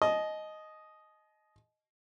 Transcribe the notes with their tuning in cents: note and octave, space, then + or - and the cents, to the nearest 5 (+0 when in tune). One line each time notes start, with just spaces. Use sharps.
D#5 +0 A5 -45